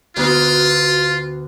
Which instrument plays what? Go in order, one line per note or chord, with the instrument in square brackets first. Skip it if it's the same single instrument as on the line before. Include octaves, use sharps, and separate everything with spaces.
[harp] D2 B3 F#4 [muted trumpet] F4